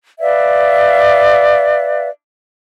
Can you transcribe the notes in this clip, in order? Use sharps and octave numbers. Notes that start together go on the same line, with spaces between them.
B4 D5 E5 F5